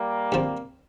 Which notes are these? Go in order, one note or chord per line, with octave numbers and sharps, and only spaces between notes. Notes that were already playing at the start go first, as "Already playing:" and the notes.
Already playing: G3 A#3
G2 F3 C4